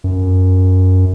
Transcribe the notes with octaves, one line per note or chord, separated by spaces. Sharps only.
F#2